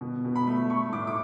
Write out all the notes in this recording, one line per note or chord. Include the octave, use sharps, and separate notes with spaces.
B2
B2
B5
A3
A3 C#6
A2 D6
D6